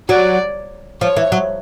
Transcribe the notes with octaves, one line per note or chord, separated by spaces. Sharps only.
F#3 D5
F3 C#5
E3
F#3